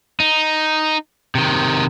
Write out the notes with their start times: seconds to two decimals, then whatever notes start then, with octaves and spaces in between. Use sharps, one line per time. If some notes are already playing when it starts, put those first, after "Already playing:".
0.20 D#4
1.35 C3 D#3